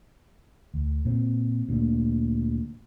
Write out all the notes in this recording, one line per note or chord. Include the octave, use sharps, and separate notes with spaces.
D2
A#2 C4
D2 A#2 A#3